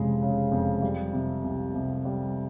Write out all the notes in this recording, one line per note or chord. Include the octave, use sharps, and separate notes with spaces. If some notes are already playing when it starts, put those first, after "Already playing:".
Already playing: F1 F2 C#3 G#3
C#3
F2
G3
C3
C2
C2
G3